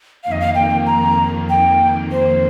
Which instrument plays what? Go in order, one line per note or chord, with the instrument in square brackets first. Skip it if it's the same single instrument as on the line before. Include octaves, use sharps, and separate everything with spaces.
[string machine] F2 D#3 A#3 [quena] F5
[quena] D#5
F5
G5
A#5
G5
C5